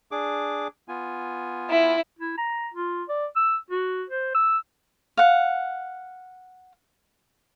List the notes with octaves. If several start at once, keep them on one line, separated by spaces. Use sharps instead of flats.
D4 G#4 D6
B3 F4 G#5
E4
E4
A#5
F4
D5
E6
F#4
C5
E6
F5 F#5